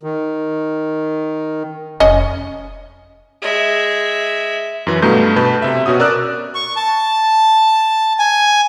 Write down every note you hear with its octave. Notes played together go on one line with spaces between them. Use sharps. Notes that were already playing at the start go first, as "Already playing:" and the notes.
D#3
F1 C#4 C#5 D#5
G#3 E5
F#2 E3
G2 B2 A3 A#5 G6
B2 B4 A5 B5 G6
C3 E5
B2 C#4 F#4 D#6
A#4 D5 D6 E6 F#6
C#6
A5
G#5